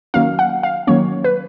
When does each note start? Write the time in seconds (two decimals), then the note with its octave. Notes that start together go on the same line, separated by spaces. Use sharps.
0.14 D#3 F#3 A#3 C#4 F5
0.39 F#5
0.63 F5
0.87 D#3 F#3 A#3 C#4 C#5
1.24 B4